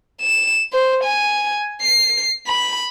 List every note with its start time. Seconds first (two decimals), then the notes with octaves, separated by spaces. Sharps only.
0.22 E7
0.73 C5
1.04 G#5
1.82 C7
2.47 B5